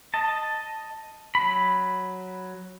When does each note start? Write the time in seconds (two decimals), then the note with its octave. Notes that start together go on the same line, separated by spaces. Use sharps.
0.14 D#5 A5
1.35 F#3 B5